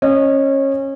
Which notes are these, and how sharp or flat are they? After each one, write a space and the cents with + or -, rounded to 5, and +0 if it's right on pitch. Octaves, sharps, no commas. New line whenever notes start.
C#4 -25 D#5 -30